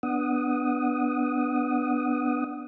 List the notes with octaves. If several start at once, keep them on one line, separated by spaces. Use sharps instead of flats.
B3 D4 F#5 D#6